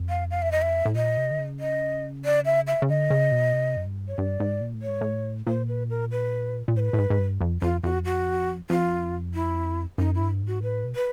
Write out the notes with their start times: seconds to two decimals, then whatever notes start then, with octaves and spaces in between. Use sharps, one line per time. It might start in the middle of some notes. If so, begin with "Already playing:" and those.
Already playing: F2
0.09 F5
0.31 F5
0.42 E5
0.52 D#5
0.62 E5
0.86 A2
0.95 A#2 D#5
1.17 C3
1.31 D3
1.39 C#3
1.60 D#5
2.25 D5
2.45 E5
2.67 E5
2.82 C#3
2.89 D3 D#5
3.10 C#3
3.32 B2
3.53 C3
3.77 F#2
3.86 G2
4.08 C#5
4.18 G2 D5
4.40 G#2
4.61 A#2
4.74 A2
4.82 C#5
4.88 G#2
5.01 A2
5.47 A#2 C5
5.68 B4
5.90 A#4
6.11 B4
6.68 A#2
6.76 A2 C5
6.80 B4
6.93 A2
6.98 G#2
7.10 G#2
7.19 G2
7.41 F2
7.62 F2 F4
7.84 F2 F#4
8.05 F#4
8.70 F2 F4
9.34 E4
9.98 F#2 D#4
10.15 E4
10.20 G2
10.42 G#2
10.47 F#4
10.63 A2 B4
10.84 B2
10.96 B4